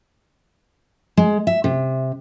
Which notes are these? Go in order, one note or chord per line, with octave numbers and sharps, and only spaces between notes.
G#3
E5
C3